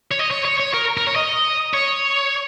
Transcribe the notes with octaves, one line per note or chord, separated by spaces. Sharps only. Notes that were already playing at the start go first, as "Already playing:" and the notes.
C#5
D#5
C#5
C#5
C#5
A#4
A#4
C#5
D#5
C#5